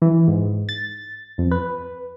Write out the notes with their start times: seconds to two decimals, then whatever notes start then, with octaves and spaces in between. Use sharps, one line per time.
0.02 E3
0.28 G#2
0.69 A6
1.38 F2
1.51 B4